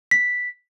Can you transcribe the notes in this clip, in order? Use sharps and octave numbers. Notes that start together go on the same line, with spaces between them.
B6